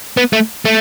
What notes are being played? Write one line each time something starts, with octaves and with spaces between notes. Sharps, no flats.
B3
A3
A3